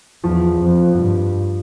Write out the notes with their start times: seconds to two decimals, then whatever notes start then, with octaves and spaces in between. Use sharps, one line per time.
0.24 E2 F3
0.61 F2
0.98 G2